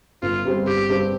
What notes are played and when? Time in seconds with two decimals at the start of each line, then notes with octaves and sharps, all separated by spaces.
0.22 G1 F4
0.45 G2 G3 C4
0.67 G1 G4
0.89 G2 G3 C4